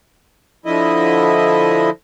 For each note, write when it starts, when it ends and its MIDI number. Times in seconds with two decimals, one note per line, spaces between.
0.66 1.90 50
0.66 1.90 53
0.66 1.90 64
0.66 1.90 75